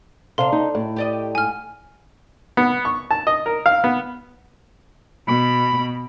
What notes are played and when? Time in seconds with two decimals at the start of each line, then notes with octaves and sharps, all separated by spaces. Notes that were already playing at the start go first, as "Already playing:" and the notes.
0.38 C3 D4 A4 F5 C6
0.52 D#4
0.75 A2
0.96 G4 D5 D#5
1.35 G#2 G#5 F6
2.57 B3
2.85 C#6
3.11 A5
3.27 D#5
3.46 A#4
3.66 F5
3.84 B3
5.27 B2 B5